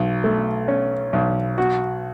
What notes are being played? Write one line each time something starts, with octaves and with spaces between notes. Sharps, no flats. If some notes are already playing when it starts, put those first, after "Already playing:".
Already playing: B1
A3
C#4
B1
F#4